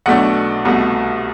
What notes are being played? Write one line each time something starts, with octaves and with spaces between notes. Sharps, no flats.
B1 B2 A3 D4 F#5
C2 B2 A3